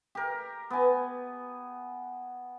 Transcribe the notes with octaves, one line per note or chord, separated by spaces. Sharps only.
G4 A#4
B3 G#5